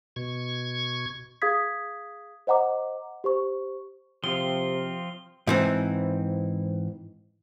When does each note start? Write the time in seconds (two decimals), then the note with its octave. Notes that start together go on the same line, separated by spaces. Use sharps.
0.16 B2 C#6 G#6
1.42 G#4 F5 D#6 G#6 B6
2.47 C5 D#5 F#5 A#5 D6
3.24 G4 C5 C#6
4.24 C3 F3 C4 F4 G7
5.47 G#2 E3 C4